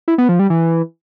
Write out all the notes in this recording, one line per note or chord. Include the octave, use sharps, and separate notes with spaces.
E4
B3
F3
G3
E3